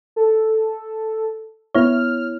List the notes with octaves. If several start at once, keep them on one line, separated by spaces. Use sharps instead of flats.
A4
B3 E4 C#5 F6